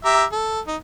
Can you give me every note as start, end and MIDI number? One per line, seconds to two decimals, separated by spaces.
0.05 0.24 67
0.05 0.24 76
0.05 0.24 82
0.32 0.60 69
0.67 0.76 63